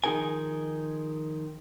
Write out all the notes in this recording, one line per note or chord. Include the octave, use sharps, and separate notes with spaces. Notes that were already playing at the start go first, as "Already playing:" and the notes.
D#3 F3 D#4 G#4 A#4 G#5